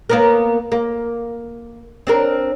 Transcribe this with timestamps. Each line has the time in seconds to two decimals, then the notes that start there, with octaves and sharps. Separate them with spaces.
0.10 A#3 B3 A#4
0.72 A#3
2.07 C4 D4 A#4